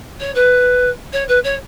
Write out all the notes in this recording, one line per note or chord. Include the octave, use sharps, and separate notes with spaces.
C#5
B4
C#5
B4
C#5